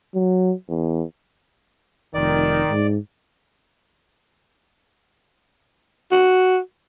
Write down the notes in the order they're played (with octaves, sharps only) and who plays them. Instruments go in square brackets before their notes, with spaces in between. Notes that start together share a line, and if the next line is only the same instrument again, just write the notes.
[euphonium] F#3
E2
[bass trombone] F1 [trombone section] D#3 [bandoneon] D5
[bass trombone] G#2
[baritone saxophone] F#4